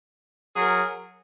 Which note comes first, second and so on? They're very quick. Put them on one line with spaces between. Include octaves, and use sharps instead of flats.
G#4 F#3 A#4